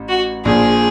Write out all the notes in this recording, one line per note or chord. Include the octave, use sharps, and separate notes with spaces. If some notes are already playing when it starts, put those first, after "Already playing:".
Already playing: A1
F#4
A#1 A#2 G#4